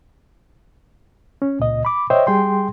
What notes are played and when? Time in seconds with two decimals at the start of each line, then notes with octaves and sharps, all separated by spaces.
1.42 C#4
1.60 C#2 A#2 D#5
1.85 B5 D6
2.10 C5 C#5 D#5 E5 G5
2.27 G3 G#4 G5 C6